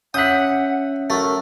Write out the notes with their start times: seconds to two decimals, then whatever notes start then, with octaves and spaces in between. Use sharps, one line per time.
0.14 C#4 E5 F#5 D#6 F#6 G6 B6
1.10 F#3 A3 A#4